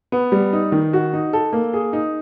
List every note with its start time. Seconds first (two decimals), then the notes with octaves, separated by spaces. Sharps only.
0.12 B3
0.32 G3
0.53 D#4
0.72 D#3
0.93 F#4
1.13 D#4
1.33 A4
1.53 A#3
1.74 G#4
1.93 D#4